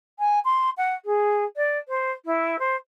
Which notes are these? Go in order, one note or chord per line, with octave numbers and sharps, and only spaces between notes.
G#5
C6
F#5
G#4
D5
C5
E4
C5